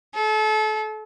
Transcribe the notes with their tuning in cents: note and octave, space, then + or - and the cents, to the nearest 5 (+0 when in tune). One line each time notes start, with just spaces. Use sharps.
A4 -35